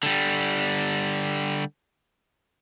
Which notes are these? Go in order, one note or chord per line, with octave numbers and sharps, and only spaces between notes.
D3 G3